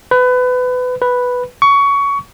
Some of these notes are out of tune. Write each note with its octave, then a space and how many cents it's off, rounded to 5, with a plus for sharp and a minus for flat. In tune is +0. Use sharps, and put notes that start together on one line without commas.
B4 +25
B4 +0
C#6 +20